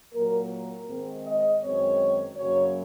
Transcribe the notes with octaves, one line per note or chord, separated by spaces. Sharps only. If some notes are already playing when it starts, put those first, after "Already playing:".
A#2 F#3 A#3 A#4
A#4
G#2 D#3 G#3 C4
D#5
F#2 D#3 G#3 C4 C#5
F#2 C#3 F#3 A#3 C#5